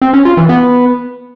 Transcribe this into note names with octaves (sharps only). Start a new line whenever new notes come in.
C4
C#4
F4
E3
B3